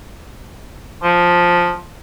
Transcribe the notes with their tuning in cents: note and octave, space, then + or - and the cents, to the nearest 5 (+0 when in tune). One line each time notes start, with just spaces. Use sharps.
F3 +5